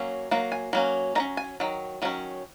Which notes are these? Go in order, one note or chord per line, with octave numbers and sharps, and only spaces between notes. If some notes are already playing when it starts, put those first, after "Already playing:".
Already playing: F#3 A#3 C#4
F#3 A#3
G#5
F#3 A#3 C#4
D#3 F#3 C#4 A#5
G#5
D#3 F#3
D#3 F#3 C#4